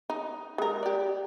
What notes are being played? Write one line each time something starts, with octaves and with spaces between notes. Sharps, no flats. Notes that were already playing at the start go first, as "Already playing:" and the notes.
D#4
G#3 A#4
G4 D5